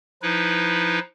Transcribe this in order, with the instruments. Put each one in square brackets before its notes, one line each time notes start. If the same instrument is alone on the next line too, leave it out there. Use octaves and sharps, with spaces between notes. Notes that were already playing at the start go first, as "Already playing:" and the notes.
[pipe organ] F3 D#4 E4 B4